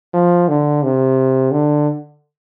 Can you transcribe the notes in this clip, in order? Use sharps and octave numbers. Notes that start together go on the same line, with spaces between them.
F3
D3
C3
D3